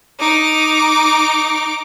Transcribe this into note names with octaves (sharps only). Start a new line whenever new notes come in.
D#4 D6